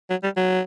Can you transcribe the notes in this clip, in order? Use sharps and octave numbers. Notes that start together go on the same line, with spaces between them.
F#3
G3
F#3